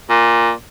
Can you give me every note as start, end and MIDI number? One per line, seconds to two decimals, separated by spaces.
0.10 0.51 46